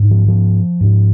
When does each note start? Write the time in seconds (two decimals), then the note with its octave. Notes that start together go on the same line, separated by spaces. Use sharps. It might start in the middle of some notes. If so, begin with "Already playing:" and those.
Already playing: G#2
0.11 F3
0.28 F3
0.81 G#2